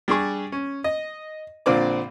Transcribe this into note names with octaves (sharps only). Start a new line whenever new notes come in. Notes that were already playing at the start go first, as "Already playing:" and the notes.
G3 D4 G#4 C#6
C#4
D#5
A#1 A#2 D3 C4 D5 D6